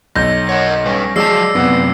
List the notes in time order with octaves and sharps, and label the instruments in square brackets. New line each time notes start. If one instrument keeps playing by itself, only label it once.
[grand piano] B1 G6 [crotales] A#6
[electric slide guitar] A#4 C#5 [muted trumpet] F#5
[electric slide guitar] G3 B4 [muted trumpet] C#4
[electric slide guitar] F3 F#3 A5 [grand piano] G#3 [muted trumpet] D5 [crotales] E6 C7
[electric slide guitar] F#2 C3 [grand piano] B3 F#5